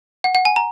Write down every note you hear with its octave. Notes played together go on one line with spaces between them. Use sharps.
F#5
F#5
G#5
A#5